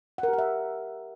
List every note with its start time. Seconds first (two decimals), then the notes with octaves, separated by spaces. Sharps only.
0.18 F#5
0.23 A#4
0.28 G4
0.33 F#5
0.38 E5